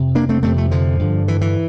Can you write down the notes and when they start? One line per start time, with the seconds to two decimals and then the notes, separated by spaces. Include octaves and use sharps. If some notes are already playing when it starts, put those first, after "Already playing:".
Already playing: F2 C3
0.15 A#3 D4
0.29 A3 C4
0.43 F2 C3 A3 C4
0.57 F3 A3
0.71 D3 F3
0.99 G2 D3
1.28 E3
1.41 E3